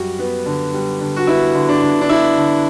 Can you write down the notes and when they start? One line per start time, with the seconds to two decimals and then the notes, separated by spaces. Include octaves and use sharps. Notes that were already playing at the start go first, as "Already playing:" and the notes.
Already playing: F#2 G3 F#4
0.19 B3
0.46 D3
0.73 G3
1.00 D3
1.16 F#4
1.27 B3 E4
1.54 D3
1.69 D4
1.82 D3
2.01 D4
2.09 B3 E4
2.37 D3